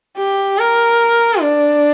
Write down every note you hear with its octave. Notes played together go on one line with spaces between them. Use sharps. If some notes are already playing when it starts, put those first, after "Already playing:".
G4
A#4
D4